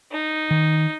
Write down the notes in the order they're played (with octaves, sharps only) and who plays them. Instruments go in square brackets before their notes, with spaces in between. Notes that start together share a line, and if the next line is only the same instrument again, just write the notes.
[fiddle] D#4
[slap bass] D#3